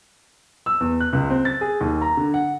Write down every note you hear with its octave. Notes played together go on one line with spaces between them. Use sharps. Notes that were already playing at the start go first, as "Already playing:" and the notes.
E6
E2
F#6
C#2
C4
A6
G#4
D#2
A#5
D3
F#5